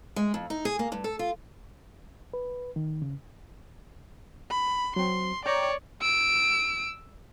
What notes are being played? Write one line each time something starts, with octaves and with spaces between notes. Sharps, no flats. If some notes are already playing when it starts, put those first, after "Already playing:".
G#3
F2
D#4
G#4
A#3
G2
A4
F4
B4
D#3
C#3
B5
F#3 C4 C6
C#5 D5 G5 A#5 D6
E6 D7